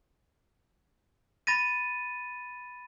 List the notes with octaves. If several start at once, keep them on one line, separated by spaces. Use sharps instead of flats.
B5 A6 A#6 D#7